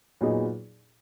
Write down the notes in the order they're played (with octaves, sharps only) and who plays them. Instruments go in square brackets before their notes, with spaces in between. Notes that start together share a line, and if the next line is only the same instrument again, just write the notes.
[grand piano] A#2 F#3 B3 D#4 G#4